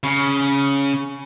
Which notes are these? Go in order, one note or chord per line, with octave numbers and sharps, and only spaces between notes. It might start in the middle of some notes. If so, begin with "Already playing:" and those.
C#3